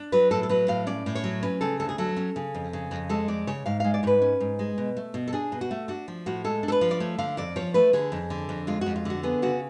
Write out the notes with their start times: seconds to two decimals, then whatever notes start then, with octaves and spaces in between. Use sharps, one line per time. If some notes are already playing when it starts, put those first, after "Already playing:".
Already playing: D4
0.12 F#3 B4
0.31 A2 A4
0.43 A4
0.49 F#3 B4
0.68 A2 F5
0.87 C#4 D5
1.06 A2
1.15 C#5
1.24 F#3
1.43 C#4 B4
1.61 C#3 A4
1.80 D2 A4
1.89 G#4
1.98 F#3 A4
2.17 C#4
2.36 C#3
2.54 F2
2.73 C#3
2.91 F2
3.09 G#3 A4
3.28 F2 D5
3.47 C#3 C#5
3.66 G#2 F5
3.80 G#3 F5
3.94 D5
4.03 G#2 C#5
4.07 B4
4.22 C#4
4.40 G#2
4.59 G#3
4.78 B2
4.97 A3
5.14 B2
5.28 A4
5.33 D4 G#4
5.52 B2
5.61 F#4
5.71 A3
5.88 D4 F#4
6.08 F3
6.26 A2 F#4
6.44 G#3 A4
6.63 D4
6.68 A4
6.72 B4
6.81 F3
6.91 D5
7.00 A3 C#5
7.18 D3 F5
7.37 F2 D5
7.56 F3 C#5
7.74 A3 B4
7.93 D3 G#4
8.12 F2
8.30 D3
8.49 F2
8.67 G#3 F4
8.81 F2 F#4
8.96 F4
9.05 D3 F#4
9.23 B3 G#4
9.42 C#3 F#4